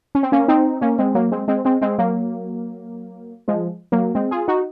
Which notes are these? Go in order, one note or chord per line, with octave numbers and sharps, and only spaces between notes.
C#4
C4
A#3 C#4
C4 D#4
A#3 C#4
G#3 C4
F#3 A#3
G#3 C4
G#3 C4
G#3 C4
G#3 C4
F#3 A#3
F3 G#3
F#3 A#3
G#3 C4
F4 G#4
D#4 F#4